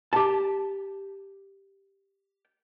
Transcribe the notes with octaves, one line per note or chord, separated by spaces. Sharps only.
G4 A5